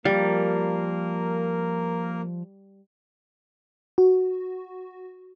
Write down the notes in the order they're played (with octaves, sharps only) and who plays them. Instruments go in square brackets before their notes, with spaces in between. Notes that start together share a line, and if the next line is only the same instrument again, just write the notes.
[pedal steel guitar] F3 F5 [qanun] G3 [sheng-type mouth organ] A#3 A#4
[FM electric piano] F#4